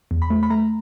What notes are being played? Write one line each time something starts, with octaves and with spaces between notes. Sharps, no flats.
E2
B5
A3
B5
A3 A#5